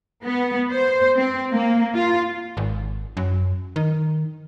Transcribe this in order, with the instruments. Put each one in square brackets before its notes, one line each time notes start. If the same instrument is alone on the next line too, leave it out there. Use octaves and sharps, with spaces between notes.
[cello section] B3
C5
C4
A#3
F4
[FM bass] G#1
F#2
D#3